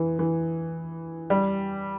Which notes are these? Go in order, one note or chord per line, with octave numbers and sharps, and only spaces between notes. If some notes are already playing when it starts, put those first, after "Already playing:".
Already playing: E3
E3
G3